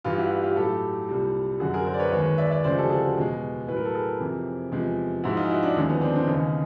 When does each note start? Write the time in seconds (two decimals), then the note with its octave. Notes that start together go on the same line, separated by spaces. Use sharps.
0.04 G2 E3 G3 F4 G4
0.18 E4 F#4
0.43 F4 G4
0.56 A2 F#3 G4 A4
1.09 C2 A#2 G3
1.60 F#2 D3 F#3 F#4 G#4
1.74 G#4 A#4
1.87 A#4 C5
1.94 D5
1.99 B4 C#5
2.12 D#2 D#3 G#3 B4 C#5
2.38 D5 E5
2.51 D5 E5
2.64 D2 C#3 F3 G#3 C5 D5
2.77 G4 A4
2.90 F#4 G#4
3.17 E2 B2 G#3
3.68 A2 B4
3.73 F#3 A#4
3.85 A4
3.95 G#4 A#4
4.20 F2 C3 E3
4.72 E2 C3 F3 G#3
5.24 G#2 F3 G#3 E4 F#4
5.37 D#4 F4
5.51 E4 F#4
5.62 D4 E4
5.76 D#2 D3 F3 G#3 C#4 D#4
5.89 B3 C#4
6.01 C4 D4
6.14 C4 D4
6.27 D#2 C#3 E3 C#4 D#4